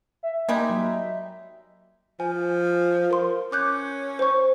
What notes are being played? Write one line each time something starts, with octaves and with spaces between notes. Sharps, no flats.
E5
G3 G#3 A#3 D#4 G5
F#3
F3 G#5
A#4 C6
C#4 D6 F#6 G6
C5 C#6